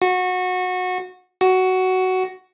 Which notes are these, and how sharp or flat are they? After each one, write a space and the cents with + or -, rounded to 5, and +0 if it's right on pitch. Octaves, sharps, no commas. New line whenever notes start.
F#4 -20
F#4 +10